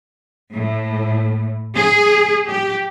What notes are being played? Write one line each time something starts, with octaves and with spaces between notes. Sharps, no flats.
A2
G#4
G4